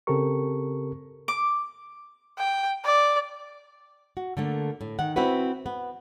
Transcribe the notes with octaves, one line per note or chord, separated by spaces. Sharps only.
C#3 C4 G4 A4 A#4 C#6
D6
G5
D5
F#4
D3 A3 A#3
A2
D#3 F#5
C4 E4 F#4 B4
B3